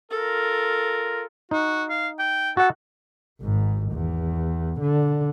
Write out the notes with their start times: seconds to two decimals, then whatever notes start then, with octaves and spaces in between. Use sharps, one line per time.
0.11 F4 A4 A#4
1.51 D#4 F#4
1.89 F5
2.19 G5
2.57 F#4 A4 F#5
3.41 G#1 G#2
3.91 E2
4.81 D3